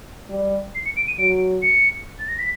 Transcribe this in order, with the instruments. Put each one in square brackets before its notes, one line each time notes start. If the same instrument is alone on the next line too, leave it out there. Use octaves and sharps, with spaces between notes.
[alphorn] G3
[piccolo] C7
C#7
D7
D#7
[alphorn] F#3 [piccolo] D7
[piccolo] C#7
A6
A#6
B6